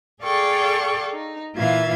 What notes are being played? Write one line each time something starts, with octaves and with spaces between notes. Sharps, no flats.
G#4 A4 D5 F5 G5 C#6
D#4
A#2 E3 F4 E5 F5 G#6